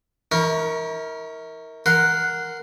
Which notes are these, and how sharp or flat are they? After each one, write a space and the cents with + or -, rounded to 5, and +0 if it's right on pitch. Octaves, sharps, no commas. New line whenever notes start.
E4 -45 A#4 -5 C#6 +0
A#4 +0 F#5 +0 C6 -20